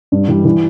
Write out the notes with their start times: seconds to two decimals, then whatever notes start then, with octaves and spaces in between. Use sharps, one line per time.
0.12 G2
0.28 E3 G3
0.45 E3